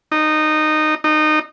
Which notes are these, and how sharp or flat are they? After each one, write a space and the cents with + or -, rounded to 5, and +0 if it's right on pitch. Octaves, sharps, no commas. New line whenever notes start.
D#4 -15
D#4 -20